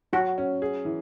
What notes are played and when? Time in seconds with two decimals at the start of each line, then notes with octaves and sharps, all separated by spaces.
0.13 F#3 F#4
0.38 C#4
0.62 G#4
0.85 E3